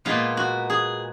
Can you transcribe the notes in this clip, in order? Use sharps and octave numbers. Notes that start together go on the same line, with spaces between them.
A#2 G#3 B3 F4
F#4
G#4